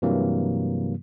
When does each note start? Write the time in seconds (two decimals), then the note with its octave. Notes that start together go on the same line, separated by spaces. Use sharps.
0.02 G2 C3 E3 F#3 A#3